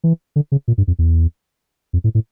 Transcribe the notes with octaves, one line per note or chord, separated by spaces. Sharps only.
E3
D3
C#3
A#2
G2
F2
E2
F2
A2
A2